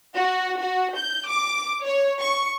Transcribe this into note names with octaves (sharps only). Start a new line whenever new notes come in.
F#4
F#4
G6
D6
C#5
C#6